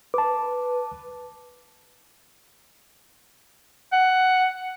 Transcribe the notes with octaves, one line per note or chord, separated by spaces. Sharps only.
B4 A5 D6
F#5